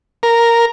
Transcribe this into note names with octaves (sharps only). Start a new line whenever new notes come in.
A#4